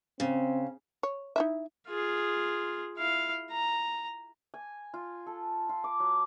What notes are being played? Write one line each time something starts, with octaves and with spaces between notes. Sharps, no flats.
C#3 C4
C#5
D#4 E4 E5
F4 G#4
E4 F5
A#5
G#5
F4
A4
F4
D6
F#3